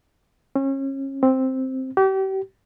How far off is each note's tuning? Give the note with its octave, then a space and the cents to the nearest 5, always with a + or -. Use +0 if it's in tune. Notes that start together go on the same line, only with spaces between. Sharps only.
C#4 -30
C4 +0
G4 -35